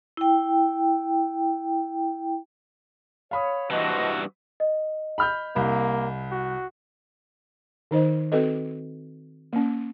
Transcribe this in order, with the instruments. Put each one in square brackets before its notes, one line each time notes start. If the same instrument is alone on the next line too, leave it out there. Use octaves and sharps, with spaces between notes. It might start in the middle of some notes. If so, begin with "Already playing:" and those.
[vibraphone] E4 G5
[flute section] C#5 [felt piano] F5 B5 D#6
[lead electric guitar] G2 E3 [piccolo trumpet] F#4 [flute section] C5 D#5 A5
[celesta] D#5
[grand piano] B5 F6 G6
[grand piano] C2 [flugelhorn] A#3
[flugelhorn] F#4
[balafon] D#3 D#4 C5 D#5
C4 F#4 A4 B4 D#5
A#3 C#4